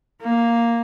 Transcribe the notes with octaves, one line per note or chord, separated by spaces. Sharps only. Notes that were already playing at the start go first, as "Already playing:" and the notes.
A#3